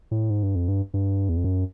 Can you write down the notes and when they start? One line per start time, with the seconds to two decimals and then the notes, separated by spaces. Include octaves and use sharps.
0.11 A2
0.30 G#2
0.43 G2
0.55 F2
0.68 G2
0.94 G2
1.29 E2
1.37 F2
1.44 F#2